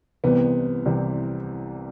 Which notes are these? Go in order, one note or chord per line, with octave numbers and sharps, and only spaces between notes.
C2 C3 E3 G3 B3 C4
C2 C3 E3 G3 C4